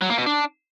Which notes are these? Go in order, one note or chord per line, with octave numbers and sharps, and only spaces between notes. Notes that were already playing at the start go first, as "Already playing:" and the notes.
F#3
A#3
B2
D4